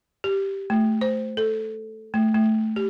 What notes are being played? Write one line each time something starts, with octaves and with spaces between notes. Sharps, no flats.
G4
A3
C5
A4
A3
A3
G4